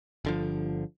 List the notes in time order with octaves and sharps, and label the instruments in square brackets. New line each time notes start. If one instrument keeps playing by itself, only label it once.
[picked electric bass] G1 D3 F3